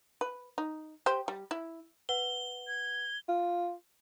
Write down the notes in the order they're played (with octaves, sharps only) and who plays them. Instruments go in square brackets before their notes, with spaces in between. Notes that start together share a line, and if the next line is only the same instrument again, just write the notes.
[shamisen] B4
D#4
G4 C5
G3
E4
[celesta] B4 F#5 [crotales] G7
[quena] G#6
[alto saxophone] F4